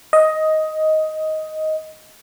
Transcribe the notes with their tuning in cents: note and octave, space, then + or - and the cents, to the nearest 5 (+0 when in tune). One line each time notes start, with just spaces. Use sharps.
D#5 +10